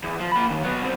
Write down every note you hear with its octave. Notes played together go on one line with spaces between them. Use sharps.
E2
F3
A#3 B5
D#2
F#3 B3
C2 C4